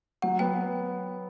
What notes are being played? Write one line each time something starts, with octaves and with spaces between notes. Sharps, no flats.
F#3 F#5
B3 G5